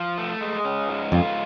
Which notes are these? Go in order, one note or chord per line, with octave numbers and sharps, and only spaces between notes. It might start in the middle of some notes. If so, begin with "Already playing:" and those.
Already playing: F3
A3
G#3
C#4
G#2
F2 F4